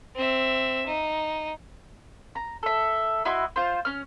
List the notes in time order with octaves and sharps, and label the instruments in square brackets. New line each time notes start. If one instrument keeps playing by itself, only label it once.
[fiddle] C4 E5
D#4
[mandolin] A#5
A4 E5
E4 F#4 D#5 C6
F4 C5
C#4 F6